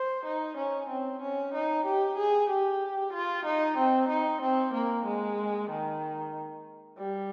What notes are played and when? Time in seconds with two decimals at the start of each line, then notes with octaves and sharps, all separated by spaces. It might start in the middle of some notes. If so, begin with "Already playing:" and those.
Already playing: C5
0.26 D#4
0.57 C#4
0.89 C4
1.21 C#4
1.54 D#4
1.86 G4
2.18 G#4
2.50 G4
3.13 F4
3.45 D#4
3.78 C4
4.09 D#4
4.42 C4
4.74 A#3
5.05 G#3
5.70 D#3
6.98 G3